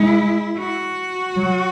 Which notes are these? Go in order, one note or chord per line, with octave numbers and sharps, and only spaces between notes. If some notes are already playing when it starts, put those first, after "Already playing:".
Already playing: G#3 E4
F#4
F#3